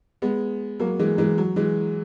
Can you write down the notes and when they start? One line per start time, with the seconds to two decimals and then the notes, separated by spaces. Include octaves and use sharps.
0.22 G#3 B3
0.79 F#3 A#3
0.99 E3 G#3
1.18 E3 G#3
1.38 F#3
1.56 E3 G#3